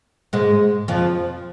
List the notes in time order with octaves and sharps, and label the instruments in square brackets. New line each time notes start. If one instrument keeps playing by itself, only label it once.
[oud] G#2 G#3
F2 F3